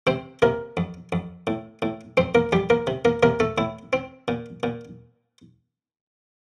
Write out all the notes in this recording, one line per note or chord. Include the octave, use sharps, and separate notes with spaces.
C3 C4 C5
C3 A#3 A#4
F2
F2
A2
A2
F2 C4 C5
A#3 A#4
F2 G3 G4
A#3 A#4
C3
A#3 A#4
C3 A#3 A#4
A3 A4
A2 E4
C4
A#2
A#2